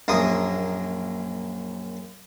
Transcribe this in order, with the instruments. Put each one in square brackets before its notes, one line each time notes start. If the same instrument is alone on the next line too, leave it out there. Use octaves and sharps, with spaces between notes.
[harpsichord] A#1 F#2 A#3 D#6